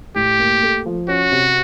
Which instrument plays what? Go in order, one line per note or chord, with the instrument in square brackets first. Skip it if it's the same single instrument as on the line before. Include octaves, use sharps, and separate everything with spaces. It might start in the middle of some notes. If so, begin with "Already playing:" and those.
[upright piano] A2 [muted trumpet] G4
[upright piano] A#3
A3
F3
[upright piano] C#4 [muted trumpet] F#4
[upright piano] C3